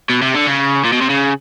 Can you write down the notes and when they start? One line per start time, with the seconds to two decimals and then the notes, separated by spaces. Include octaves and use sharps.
0.10 B2
0.22 C3
0.35 D3
0.47 C#3
0.85 A#2
0.93 B2
1.02 C3
1.10 C#3